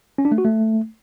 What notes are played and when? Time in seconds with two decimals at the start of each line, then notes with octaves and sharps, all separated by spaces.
0.18 C#4
0.25 D4
0.32 A3
0.38 F#4
0.45 A3